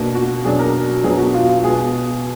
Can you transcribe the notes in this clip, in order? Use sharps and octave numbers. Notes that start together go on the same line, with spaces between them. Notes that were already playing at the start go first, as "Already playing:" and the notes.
Already playing: B2 A#3 D4
F#4
B2 F#3 D4 G#4
A#4
B2 F#3 B3 D4 G#4
F#4
F4
F4
B2 G#3 B3 G#4